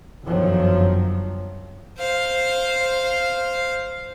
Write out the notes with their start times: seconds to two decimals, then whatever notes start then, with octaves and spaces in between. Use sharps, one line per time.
0.23 G1 F#2 D#3 F3 F#3
1.98 C5 F5